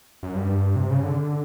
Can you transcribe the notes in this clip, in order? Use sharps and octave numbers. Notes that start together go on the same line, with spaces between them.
F#2
G2
C3
C#3
D3